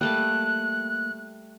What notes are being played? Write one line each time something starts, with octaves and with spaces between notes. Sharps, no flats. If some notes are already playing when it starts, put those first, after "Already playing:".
G3 A3 A#3 A5 F#6